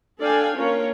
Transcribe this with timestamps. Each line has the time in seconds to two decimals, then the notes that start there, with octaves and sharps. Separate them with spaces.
0.20 D4 A4 D5 F5 G5 G#5
0.57 A#3 C#4 D4 F4 A#4 C#5